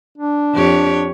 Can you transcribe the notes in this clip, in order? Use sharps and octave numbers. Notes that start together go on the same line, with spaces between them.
D4
F2 G4 C#5